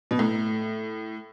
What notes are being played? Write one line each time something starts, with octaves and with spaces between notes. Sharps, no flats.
B2
A2